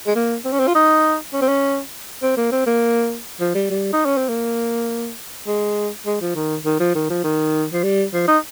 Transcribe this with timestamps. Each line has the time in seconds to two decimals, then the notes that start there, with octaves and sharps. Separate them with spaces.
0.06 G#3
0.15 A#3
0.45 C4
0.52 C#4
0.60 C4
0.67 F4
0.75 D#4
1.33 C#4
1.41 C4
1.49 C#4
2.22 C4
2.37 A#3
2.52 C4
2.66 A#3
3.40 F3
3.55 G3
3.70 G3
3.93 D#4
4.05 C#4
4.17 C4
4.29 A#3
5.47 G#3
6.06 G#3
6.21 F3
6.35 D#3
6.65 D#3
6.80 F3
6.95 D#3
7.10 F3
7.24 D#3
7.73 F3
7.84 G3
8.13 F3
8.28 D#4